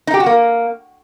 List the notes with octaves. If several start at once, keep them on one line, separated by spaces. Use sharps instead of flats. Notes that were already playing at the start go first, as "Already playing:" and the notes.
D#4
G4
F#4
A#3